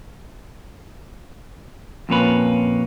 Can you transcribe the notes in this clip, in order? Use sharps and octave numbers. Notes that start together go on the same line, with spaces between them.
F2 A#2 A#3 C#4 B4